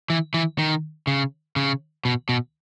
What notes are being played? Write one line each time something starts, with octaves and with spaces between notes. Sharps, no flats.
E3
E3
D#3
C#3
C#3
B2
B2